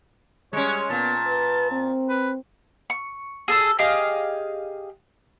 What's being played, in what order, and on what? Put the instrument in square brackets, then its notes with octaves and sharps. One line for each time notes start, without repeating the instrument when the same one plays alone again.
[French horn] G3 [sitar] G#3 C#4 [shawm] C#5
[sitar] A#2 [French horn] B3 [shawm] A5
[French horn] B4
C4
[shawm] B4
[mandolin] C#6
G#4 A4 E6
G4 G#4 D#5 F5